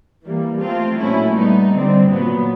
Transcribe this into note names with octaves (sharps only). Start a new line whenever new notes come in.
E3 G3 A#3
F3 A3 C4 F4
A#2 F#3 A3 C#4 E4
G3 B3 D#4
D3 G3 C4
A#2 F#3 B3